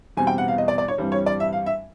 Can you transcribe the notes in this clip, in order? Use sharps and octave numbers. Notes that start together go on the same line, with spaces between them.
E2 B2 G3 C4 G#5
G5
F#5
F5
D#5
D5
D5
C#5
G2 E3 G3 C4
C#5
D5
E5
F5
E5